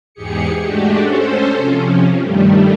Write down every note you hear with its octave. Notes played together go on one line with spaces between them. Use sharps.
E2 G#2 G4 G#4 C#7
G#3 A3 D4 F#4 G4
C#4 A4 C5
C3 F3 C#4
G2 D#3 G3 A3